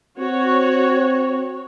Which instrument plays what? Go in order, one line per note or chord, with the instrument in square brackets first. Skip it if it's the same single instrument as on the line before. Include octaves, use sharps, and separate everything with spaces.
[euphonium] C4 [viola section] F#4 C#5